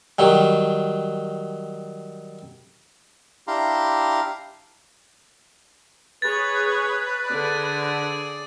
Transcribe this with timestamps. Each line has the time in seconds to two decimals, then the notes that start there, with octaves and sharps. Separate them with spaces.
0.19 D#3 F#3 G3
3.48 D4 E4 G4 F5 A#5 C6
6.22 G#4 B4 C#5 A6
7.28 D3 G#4 D5